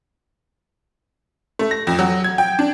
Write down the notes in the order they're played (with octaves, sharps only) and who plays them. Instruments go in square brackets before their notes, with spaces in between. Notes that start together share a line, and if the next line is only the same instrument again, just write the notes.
[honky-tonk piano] A3
A#6
F2
F#3
G#6
G5
D4